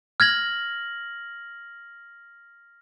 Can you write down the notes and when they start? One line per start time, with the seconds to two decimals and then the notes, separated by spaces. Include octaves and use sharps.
0.20 F6 G#6 A#6 F#7